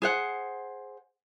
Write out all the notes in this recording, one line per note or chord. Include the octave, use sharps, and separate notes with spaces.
G#4 C5 F#5